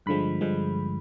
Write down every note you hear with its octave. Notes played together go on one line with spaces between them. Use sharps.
G2 D3 F3 G#3 B5
G2 D3 F3 G#3